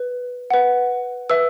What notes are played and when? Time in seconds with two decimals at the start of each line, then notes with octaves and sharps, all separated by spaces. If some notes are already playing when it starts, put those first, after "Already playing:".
Already playing: B4
0.50 B4 F#5
1.30 B4 E5 E6